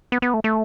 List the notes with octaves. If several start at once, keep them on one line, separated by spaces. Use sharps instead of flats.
B3
B3
A3
A3